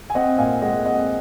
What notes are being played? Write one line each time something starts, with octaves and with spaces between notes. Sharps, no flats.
G#5
C4 D#5 F#5
A#2 F5 G#5
G#3 D#5 F#5
C4 D#5 F#5